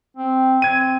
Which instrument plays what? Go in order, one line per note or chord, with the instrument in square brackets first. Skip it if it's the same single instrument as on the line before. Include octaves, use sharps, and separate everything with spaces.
[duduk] C4
[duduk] C4 [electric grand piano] G#6 D#7